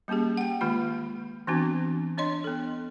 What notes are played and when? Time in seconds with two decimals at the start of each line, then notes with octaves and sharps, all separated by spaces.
0.08 G3 A#3 C#4 G4 G#4
0.37 F#5 G5
0.61 D#3 G#3 A#3 F4 B5
1.47 E3 B3 C4 D4 F#4
2.18 D4 C#5 D#5 C6
2.44 B3 A4